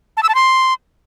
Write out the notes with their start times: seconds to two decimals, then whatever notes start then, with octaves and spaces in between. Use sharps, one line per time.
0.17 A5
0.23 E6
0.29 A5
0.35 C6